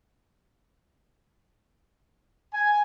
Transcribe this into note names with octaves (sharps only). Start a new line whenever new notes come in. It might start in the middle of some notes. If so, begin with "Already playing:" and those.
G#5